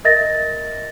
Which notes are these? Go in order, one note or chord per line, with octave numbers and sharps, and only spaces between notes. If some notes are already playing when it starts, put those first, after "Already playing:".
A#4 D#5 E5 A6 A#6